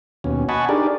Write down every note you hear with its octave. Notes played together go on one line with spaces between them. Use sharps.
D#2 B2 C#4
D#5 F#5 G#5 A5 B5 C#6
D4 D#4 G4 G#4 A#4 D5